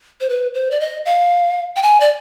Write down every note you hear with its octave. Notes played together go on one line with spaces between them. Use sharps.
C5
B4
C5
D5
D#5
F5
G5
G#5
D5